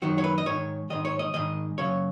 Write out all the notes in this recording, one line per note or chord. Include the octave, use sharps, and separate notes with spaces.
F#2 D#3 F#4
C#5
B4
D#5
G#2 D#3 C#5
G#2 D#3 D#5
C#5
D#5
G#2 D#3 D#5
F#2 C#3 C#5